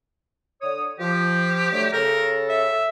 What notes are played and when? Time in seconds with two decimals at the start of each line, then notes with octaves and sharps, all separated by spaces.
0.61 D3 C#5 D#6
1.00 F3 G4
1.72 D3 F#3 A3
1.93 C#3 A4 A#4
2.49 E5